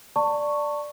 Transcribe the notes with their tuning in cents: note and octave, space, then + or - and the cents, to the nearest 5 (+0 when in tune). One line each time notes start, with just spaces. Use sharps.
D5 +0 A5 +25 C#6 +0